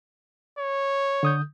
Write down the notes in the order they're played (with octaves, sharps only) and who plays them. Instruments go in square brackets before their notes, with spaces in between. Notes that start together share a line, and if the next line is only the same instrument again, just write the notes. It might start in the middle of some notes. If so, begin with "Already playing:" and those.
[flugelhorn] C#5
[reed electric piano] D3 D#6 G6